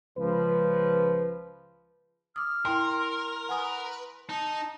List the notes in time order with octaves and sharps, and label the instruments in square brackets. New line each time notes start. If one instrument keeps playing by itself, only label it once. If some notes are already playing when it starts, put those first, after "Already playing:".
[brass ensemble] C#2 F3 B4
[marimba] D6 D#6 [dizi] F6
[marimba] E4 G5 [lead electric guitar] A#4 [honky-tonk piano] C6
[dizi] B4 [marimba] F#5 G#5 D#6
[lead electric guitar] D#4 [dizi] A5